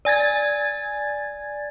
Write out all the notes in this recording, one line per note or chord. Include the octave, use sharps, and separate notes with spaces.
D5 G#5 G#6 A6